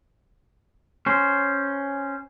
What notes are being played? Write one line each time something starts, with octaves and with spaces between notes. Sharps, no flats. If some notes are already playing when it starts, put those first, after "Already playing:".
C#4 C5